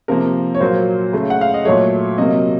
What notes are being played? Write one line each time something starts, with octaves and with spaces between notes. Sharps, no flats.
C3 F3 A#3 A#4
C#5
A#2 F#3 A#3 C5
C#3 A3
F#5
F5
D#5
A#2 F#3 A3 C#5
C3 F#3 A#3 D#5